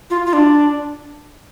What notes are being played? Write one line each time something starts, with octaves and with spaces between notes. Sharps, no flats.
F4
F4
D4